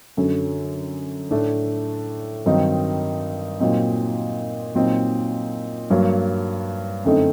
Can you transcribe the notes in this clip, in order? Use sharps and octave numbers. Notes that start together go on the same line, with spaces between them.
F#2 D3 F#3
A2 A3 D4
G2 D#3 F#3 C4 D#4
A#2 F#3 C4 D#4
A#2 F#3 C4 D#4
G2 F#3 A#3
F#2 D3 A3 C4 D#4